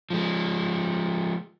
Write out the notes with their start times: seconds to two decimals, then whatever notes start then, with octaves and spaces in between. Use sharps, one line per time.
0.10 F3 G#3